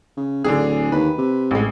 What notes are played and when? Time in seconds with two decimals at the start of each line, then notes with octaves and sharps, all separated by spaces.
0.17 C#3
0.44 D1 D3 D4 G#4
0.92 D#2 B4
1.18 C3
1.51 A1 G#3